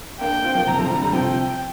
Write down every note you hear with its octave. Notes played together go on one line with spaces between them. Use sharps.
A#3 D4 G5
C4 F4
F3 A#3
C3 F3 A#5
C3 F3
D3 G3
D3 G3
C3 F3 G5